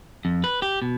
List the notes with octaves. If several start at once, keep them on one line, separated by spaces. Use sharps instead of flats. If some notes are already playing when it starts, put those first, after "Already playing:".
F2
B4
G4
B2